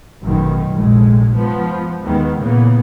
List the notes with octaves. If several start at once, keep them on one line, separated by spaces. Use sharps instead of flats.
A1 F#2 B2 D#3
F1 A#1 A2 G#3
G#2 F3 B3
D#2 D#3 E3 G#3 B3
A#2 C#3 E3 A#3 B3